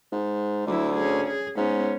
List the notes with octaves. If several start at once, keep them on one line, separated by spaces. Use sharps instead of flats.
G#2
D2 F#3 E4
C#4 G#4
G#4
G#2 B3 C#4